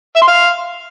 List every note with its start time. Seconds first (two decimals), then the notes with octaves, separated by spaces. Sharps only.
0.16 E5
0.22 C6
0.28 F5